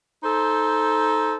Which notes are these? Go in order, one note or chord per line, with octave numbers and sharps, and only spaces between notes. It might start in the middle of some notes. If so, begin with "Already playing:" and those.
D#4 A4 C5